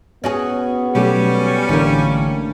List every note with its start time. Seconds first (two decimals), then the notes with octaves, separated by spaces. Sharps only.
0.24 B3 C#4 F#4 G#4
0.95 B2 F#3 G3 A3 C#4 G4
1.69 A1 D2 D3 E3 A#3